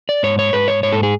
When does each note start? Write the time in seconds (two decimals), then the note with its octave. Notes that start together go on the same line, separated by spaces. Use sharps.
0.09 D5
0.23 G#2 C#5
0.39 C#5
0.53 G#2 B4
0.68 C#5
0.83 G#2 C#5
0.92 A4
1.03 G#4